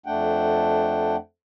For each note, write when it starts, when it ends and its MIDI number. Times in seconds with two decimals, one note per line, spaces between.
0.06 1.16 41
0.06 1.16 57
0.06 1.16 62
0.06 1.16 78
0.06 1.16 79